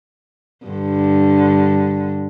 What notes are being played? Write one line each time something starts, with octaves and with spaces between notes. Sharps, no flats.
G2 D3